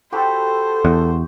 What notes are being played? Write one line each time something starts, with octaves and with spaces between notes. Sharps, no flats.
F#4 G4 A4 C5 B5
E2